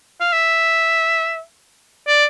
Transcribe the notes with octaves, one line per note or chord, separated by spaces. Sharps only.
F5
E5
D5